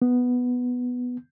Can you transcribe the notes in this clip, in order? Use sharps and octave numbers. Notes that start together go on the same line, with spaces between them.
B3